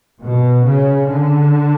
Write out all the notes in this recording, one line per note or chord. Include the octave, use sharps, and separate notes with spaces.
B2
C#3
D3